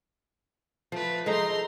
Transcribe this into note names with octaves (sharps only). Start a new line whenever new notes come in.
F3 A3 B4
G#3 D#4 A4 C5 A#5 C6